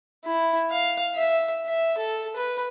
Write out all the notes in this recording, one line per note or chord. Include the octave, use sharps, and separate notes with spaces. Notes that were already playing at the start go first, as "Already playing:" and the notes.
E4
F5
E5
E5
A4
B4